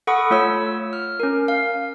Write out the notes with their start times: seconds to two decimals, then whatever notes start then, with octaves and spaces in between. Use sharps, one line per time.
0.07 A4 F#5 B5 C#6 D#6
0.30 A3 F4 C#5 E6
0.93 F6
1.20 C#4 A#4
1.48 F5